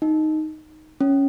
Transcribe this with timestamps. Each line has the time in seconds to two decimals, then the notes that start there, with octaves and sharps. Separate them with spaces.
0.02 D#4
1.01 C#4